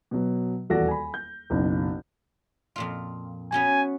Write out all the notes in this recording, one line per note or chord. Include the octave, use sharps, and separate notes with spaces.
B2 F#3
D#1 E2 F#4 A4 D5 A#6
G#5 B5
G6
F#1 B1
F2 A#2 F4
B3 C#4 F#4 G#5